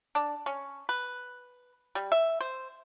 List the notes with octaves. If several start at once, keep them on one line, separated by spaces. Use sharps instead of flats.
D4
C#4
B4
G3
E5
C5